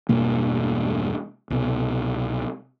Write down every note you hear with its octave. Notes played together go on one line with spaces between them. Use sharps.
E1 G2 B2 A#3
C2 B2